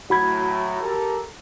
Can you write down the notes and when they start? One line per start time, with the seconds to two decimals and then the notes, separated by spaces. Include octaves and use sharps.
0.10 A2 F#3 F#4 B5 G#6
0.81 G4 A4 A#4